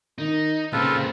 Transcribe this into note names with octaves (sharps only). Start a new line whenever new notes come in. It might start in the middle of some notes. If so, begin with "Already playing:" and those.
D#3 D#4
A#2 C#3 C4 F4 A4 B4